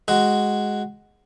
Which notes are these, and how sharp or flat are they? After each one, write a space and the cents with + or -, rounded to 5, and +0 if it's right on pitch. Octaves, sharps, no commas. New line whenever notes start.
G#3 +0 F#4 +0